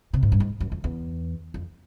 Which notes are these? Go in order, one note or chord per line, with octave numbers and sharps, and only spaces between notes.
C3
G#2
G2
G#2
F#2
F2
E2
F2